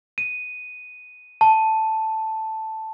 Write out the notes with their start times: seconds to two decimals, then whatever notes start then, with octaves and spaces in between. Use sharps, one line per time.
0.18 D#7
1.41 A5